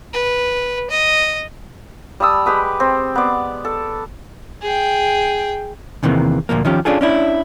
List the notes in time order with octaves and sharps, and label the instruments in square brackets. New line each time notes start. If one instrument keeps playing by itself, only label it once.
[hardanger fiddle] B4
D#5
[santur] G3 A5 D#6 E6
G#3 G4 B4 D#6
C4
B3 D5
A4
[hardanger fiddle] G#4 G5
[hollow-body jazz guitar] E2 C3 D#3 E3 A#3
D2 A#2 F3 A#3
D#3 F3 C#4 G4
C#4 D4 F4 G#4 A4
C#4 D4 E4